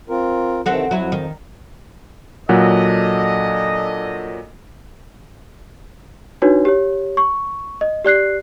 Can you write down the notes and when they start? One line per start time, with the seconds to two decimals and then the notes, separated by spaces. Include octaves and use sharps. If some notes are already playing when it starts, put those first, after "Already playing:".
0.09 C4 F4 A#4
0.66 C3 D#3 E3 C4 F#4 A4
0.91 F2 F#3 E4
1.12 D#3
2.49 A#2 F#3 D4 A4 D#5 F#5
6.42 D4 D#4 F#4 B4 C#5
6.65 G4 C#5
7.17 C#6
7.81 D#5
8.05 G4 D5 F#6 C7